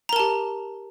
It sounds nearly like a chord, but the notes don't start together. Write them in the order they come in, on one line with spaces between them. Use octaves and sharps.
A#5 A#4 A5 G4